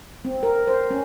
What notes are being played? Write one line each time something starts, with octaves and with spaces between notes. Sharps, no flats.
C4
A#4
C5
C#4